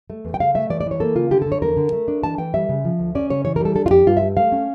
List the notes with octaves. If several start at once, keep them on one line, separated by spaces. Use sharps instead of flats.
A3
E2
G5
C#3 F5
A3 E5
E3 D5
D5
E3
C#5
A#3 A4
C#3 F4
D3 G4
D3 A4
C#5
E2 A#4
D3
A3
D4
E3 A5
E3 G5
G3 E5
C#3
F3
D2
C#4 D5
C#3 C#5
E3 C#5
A#4
G3 A4
D4 A4
F4
F2 G4
G2 F4
G3 E5
A3 F5
C#4